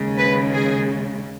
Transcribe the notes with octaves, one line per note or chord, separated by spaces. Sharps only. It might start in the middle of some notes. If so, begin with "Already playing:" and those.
Already playing: D#2 C#3 G#3
B4
G#4